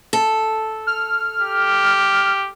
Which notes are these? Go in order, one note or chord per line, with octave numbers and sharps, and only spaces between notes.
A4
F6
G4